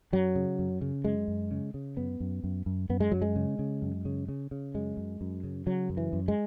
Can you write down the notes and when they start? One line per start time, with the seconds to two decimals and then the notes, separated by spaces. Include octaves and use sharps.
0.12 F#2 F#3
0.36 C#3
0.59 F#2
0.81 C#3
1.04 F#2 G#3
1.28 F#2
1.51 C#3
1.74 C#3
1.97 F#2 B3
2.20 F#2
2.44 F#2
2.66 F#2
2.89 F#2 B3
3.00 G#3
3.11 F#2 F#3
3.22 G#3
3.36 C#3
3.59 C#3
3.82 F#2
4.05 C#3
4.29 C#3
4.51 C#3
4.74 F#2 G#3
4.97 F#2
5.21 F#2
5.44 C#3
5.66 C#3 F#3
5.90 F#2
5.97 E3
6.13 F#2
6.28 G#3